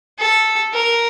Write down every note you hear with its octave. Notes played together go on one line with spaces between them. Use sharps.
A4
A#4